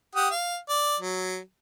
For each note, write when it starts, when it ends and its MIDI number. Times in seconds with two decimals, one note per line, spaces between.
0.15 0.29 67
0.15 0.29 78
0.15 0.29 87
0.31 0.57 77
0.69 0.97 74
1.00 1.39 54